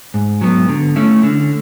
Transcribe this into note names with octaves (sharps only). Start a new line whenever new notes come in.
G#2
F#3 B3
D3
A3 C#4 E4
D3